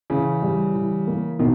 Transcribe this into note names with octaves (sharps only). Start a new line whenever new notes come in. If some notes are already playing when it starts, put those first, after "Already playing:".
C#3 E3
G3
E3
A#3
B2 D#3